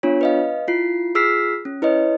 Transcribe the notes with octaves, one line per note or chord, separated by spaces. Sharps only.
B3 D4 F4 C#5
B4 D#5 F5
E4 F4 C7
F4 G#4 E6 F6 B6 C7
C#4
E4 B4 C#5 D#5